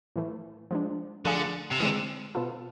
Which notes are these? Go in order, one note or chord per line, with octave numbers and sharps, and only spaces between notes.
A2 E3 A3
F3 G#3 D4
D3 F3 A3 D4 F4 G#4
C3
D3 E3 G#3 C4
B2 B3 F4 A4